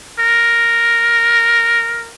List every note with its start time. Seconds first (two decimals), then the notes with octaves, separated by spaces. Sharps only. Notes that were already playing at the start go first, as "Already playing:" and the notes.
0.19 A#4